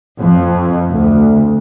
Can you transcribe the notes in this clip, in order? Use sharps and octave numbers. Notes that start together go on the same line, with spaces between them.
F2
D2